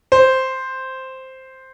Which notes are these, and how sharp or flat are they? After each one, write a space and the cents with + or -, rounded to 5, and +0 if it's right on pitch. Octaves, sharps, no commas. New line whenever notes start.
C5 +0